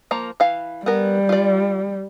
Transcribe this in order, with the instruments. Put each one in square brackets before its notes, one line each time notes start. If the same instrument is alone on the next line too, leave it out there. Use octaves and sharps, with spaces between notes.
[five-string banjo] F3 A#3 A#5
E3 F5
[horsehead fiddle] G3 [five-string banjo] B3 A#4
[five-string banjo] F4 D5